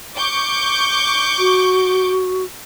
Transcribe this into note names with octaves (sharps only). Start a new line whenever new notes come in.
C#6 D6 G6
F#4